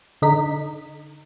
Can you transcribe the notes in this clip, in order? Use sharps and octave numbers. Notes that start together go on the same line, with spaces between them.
D3 D#4 B6